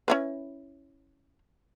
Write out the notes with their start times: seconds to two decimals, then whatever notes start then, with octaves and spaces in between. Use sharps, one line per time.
0.08 C#4 E4 B4